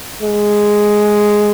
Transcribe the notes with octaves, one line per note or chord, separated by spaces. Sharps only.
G#3